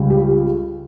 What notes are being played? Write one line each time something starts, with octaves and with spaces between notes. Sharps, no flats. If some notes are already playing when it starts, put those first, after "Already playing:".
Already playing: C#2 C#3 G3
G4
G4